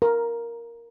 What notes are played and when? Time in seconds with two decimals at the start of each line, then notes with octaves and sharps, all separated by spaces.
0.02 A#4